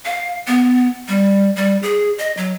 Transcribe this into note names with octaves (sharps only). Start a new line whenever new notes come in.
F5
B3
G3
G3
G#4
D#5
F#3